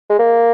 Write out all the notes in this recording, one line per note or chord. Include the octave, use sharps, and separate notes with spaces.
G#3
A#3